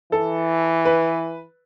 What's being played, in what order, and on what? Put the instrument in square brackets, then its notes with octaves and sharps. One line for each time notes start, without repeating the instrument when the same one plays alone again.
[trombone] E3 [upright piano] A4
[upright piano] B4